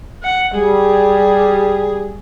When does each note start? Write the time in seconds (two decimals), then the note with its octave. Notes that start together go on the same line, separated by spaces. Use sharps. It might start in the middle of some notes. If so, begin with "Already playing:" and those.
0.23 F#5
0.55 G3 G#4